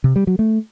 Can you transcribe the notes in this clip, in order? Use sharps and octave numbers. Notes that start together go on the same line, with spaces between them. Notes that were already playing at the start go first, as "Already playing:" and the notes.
C3
G3
F#3
A3